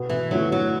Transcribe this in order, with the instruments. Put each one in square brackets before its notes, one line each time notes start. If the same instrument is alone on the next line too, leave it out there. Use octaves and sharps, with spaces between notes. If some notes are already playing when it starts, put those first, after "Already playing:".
Already playing: [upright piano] B2 B3 F#4 B4
[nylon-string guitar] E3
[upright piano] D3 A3 E4 B4 [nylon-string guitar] F#3
[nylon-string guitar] F#3